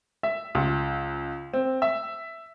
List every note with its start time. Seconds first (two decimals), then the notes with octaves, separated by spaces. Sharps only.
0.23 E5
0.55 C#2
1.53 C4
1.82 E5